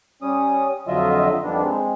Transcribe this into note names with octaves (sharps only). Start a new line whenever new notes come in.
G3 C#4 D#6
F2 D3 F#3 F4 D#5 E5
F2 D#3 G3 B3 D4
G#3 C4